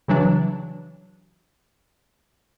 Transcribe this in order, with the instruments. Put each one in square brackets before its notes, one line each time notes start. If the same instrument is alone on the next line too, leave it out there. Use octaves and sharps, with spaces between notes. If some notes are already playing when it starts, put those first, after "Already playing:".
[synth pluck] C#3 E3 F#3 D4